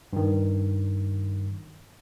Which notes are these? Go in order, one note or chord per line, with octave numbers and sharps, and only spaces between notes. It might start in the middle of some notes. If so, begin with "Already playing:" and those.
G2 D#3